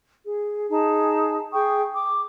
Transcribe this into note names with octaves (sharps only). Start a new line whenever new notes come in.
G#4
D#4 G#4 A5
G#4 G5 C#6 D#6
D6